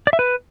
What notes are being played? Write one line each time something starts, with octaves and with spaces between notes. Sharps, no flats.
D5
E5
B4